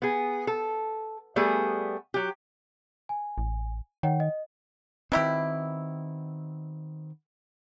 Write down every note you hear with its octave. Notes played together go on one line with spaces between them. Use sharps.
B3 G#4
A4
G3 A3 B3 G#4
F#3 G4
G#5
A1
D#3 C#5 F#5 G5
D#5
B2 D#3 C4 E4 G4